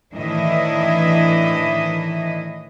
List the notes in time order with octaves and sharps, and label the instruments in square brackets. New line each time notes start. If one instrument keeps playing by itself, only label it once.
[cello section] A2 D#3 E3 D4 E4 D#5